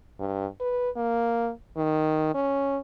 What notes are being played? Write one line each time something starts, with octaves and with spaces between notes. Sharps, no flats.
G2
B4
A#3
D#3
C#4